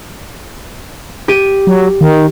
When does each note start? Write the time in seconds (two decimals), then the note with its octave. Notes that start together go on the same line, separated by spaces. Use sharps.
1.28 G4 D#7
1.67 F#3
2.01 D#3